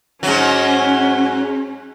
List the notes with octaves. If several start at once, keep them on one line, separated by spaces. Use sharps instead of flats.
G#2 F#3 C#4